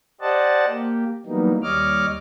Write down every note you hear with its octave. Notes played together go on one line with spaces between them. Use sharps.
G4 C5 D5 D#5 F#5 A5
A#3 G4
E3 F#3 G3 A#3 B3 D#4
D#2 G3 C#5 D#5 D6 F6